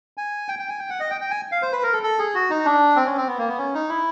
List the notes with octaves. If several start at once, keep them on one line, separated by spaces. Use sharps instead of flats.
G#5
G5
G5
G#5
G5
F#5
D#5
G5
G5
G#5
F5
C5
B4
A#4
A4
A4
G#4
F#4
D#4
D4
C4
C#4
C4
B3
A#3
B3
C#4
D#4
E4